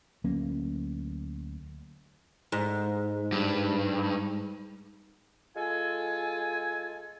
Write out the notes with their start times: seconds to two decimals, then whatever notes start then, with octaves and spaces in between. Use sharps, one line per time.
0.24 D2 F#3 A#3 C#4
2.52 G#2
3.32 G2
5.55 G#3 F4 A4 G#5